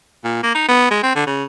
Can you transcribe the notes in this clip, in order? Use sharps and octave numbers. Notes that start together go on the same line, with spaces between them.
A#2
A#3
D#4
B3
G#3
C4
D3
C#3